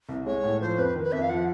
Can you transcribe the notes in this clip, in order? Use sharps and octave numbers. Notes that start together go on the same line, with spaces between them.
C2
G#3 C#5
A2
F3 C5
F2 B4
D#3
B4
F2 E5
F5
F3 F#5